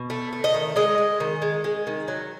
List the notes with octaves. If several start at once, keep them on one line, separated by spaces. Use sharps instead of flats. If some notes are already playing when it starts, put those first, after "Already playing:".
Already playing: B2
A3
A3
D#5
D#3
G#3 D#5
G#3
D#3
G#3
G#3
D#3
F#3